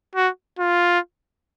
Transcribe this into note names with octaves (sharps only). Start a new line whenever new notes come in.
F#4
F4